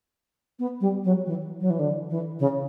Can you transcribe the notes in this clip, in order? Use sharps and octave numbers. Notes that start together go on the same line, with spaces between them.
B3
G3
F#3
E3
F#3
E3
D3
E3
C#3